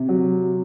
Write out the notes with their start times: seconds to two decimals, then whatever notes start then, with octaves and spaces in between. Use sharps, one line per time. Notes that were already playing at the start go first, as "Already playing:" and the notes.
Already playing: C3
0.09 F#3